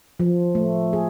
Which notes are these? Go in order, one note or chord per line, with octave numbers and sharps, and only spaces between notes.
F3
A3
G#4